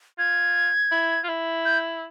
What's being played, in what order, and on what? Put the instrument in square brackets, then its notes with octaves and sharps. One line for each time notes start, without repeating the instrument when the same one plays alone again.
[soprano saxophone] F4 [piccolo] G#6
[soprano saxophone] E4
F4
E4
[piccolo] G6